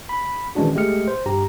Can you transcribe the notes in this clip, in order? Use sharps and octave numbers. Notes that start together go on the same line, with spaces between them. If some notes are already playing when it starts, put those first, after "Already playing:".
B5
D#3 E3 G#3 C#4 D4 F#4
G#3 A3 G4 D#5 F6 C#7
C5
G2 G4 A#5